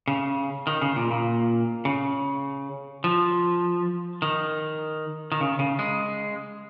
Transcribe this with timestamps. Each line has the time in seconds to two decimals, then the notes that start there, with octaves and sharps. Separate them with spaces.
0.08 C#3
0.67 D#3
0.82 C#3
0.96 A#2
1.11 A#2
1.85 C#3
3.04 F3
4.22 D#3
5.32 D#3
5.41 C#3
5.59 C#3
5.79 G#3